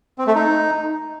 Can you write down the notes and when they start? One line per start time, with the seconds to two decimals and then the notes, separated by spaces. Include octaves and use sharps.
0.18 C4
0.27 A3
0.35 D#4